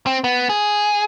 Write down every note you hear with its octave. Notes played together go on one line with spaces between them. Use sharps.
C4
B3
G#4